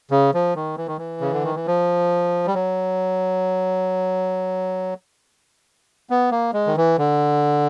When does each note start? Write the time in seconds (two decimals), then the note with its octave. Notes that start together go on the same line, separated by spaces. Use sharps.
0.11 C#3
0.34 F3
0.56 D#3
0.77 E3
0.87 D#3
0.98 E3
1.21 C#3
1.32 D3
1.44 D#3
1.55 E3
1.67 F3
2.47 G3
2.55 F#3
6.10 B3
6.31 A#3
6.53 G#3
6.67 D#3
6.77 E3
6.98 D3